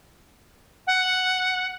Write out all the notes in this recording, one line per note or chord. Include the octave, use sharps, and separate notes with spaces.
F#5